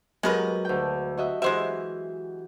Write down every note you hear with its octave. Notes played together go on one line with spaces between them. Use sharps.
F#3 G#3 B3 G4 A#4 B4
D2 G5
F#4 D#5 E5
E3 G#3 F#4 G4 C5 E5